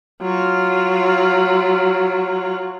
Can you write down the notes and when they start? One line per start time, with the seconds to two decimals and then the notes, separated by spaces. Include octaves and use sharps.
0.21 F#3 F4